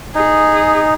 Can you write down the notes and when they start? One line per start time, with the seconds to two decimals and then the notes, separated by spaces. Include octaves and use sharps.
0.15 D#4 G#4